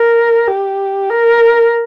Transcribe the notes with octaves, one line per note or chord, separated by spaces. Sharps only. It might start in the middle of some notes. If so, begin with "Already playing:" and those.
Already playing: A#4
G4
A#4